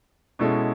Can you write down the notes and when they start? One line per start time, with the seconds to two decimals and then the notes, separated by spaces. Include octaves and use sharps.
0.39 B2 G#3 C#4 E4 A4